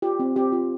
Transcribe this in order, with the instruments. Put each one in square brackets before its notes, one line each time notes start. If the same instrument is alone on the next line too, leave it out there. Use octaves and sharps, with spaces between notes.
[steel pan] F4 G4
C4
C4 G4
F4